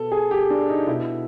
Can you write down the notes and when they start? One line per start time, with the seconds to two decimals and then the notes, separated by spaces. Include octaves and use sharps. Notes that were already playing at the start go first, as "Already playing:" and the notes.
Already playing: B2 A4
0.12 G#4
0.31 G4
0.50 D4
0.69 D#4
0.87 B2 E4